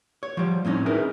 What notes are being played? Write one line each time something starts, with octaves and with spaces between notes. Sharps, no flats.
C#5
F3 G3
A2 C4 C#4 D#4
D#4 E4 G#4 A#4 B4